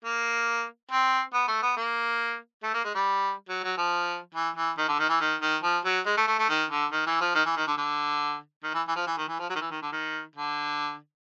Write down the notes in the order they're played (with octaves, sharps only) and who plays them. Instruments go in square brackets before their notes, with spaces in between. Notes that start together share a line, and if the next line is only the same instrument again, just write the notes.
[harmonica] A#3
C4
B3
A3
B3
A#3
A3
A#3
G#3
G3
F#3
F#3
F3
E3
E3
D#3
D3
D#3
E3
D#3
D#3
F3
F#3
G#3
A3
A3
A3
D#3
D3
D#3
E3
F3
D#3
E3
D#3
D3
D3
D#3
E3
E3
F3
E3
D#3
E3
F3
F#3
D#3
E3
D#3
D3
D#3
D3